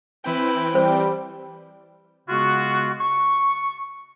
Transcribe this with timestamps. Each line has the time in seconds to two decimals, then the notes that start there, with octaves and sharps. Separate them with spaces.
0.24 E3 C4 E4 B4 G5
0.75 G3 C5
2.29 C#3 G#3 B3 F4 F#4
3.00 C#6